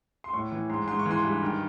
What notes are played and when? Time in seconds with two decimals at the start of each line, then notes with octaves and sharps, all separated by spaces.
0.24 C6
0.33 A2 C#6
0.51 E3
0.69 G#2 C6
0.87 G#2 C6
0.99 C#6
1.06 E3
1.11 C6
1.24 G2
1.42 D#3